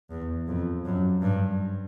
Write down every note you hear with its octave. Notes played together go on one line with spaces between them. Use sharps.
E2
F2
F#2
G2